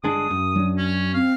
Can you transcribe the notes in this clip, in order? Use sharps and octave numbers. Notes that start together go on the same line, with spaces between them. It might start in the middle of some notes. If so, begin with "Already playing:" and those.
G1 G#3 D4 D#6
F#2
F#3 D4
C#4
C4 F5